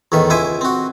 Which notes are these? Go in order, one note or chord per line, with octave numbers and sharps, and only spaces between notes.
E2 A2 D#3 E5
C#2 E4 C5 E5 G#5 D6
C4 F#4